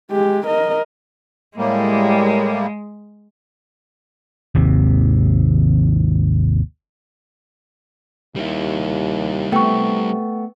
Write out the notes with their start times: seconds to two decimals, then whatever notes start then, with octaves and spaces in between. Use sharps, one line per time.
0.11 G#3 G4
0.47 A#4 D#5
1.57 A2 G3 G#3 A#3
4.55 G#1 D#2 C3
8.36 D#2 G3 E4
9.52 C3 A3 B3 G5 C#6